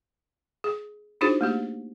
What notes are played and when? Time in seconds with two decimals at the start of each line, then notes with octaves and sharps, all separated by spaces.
0.64 G#4
1.21 D4 D#4 F4 F#4 G#4 C5
1.41 A3 A#3 G4